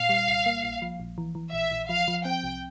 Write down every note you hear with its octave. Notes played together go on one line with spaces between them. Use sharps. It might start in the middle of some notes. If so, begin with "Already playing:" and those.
Already playing: A#2 F5
G3
C2
A#3
A#1
F3
A#1
E3
E3
A#1 E5
A#1
F3 F5
F3
C4 G5
C2